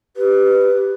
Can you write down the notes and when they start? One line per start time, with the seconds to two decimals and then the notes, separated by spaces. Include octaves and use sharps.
0.17 G4 B4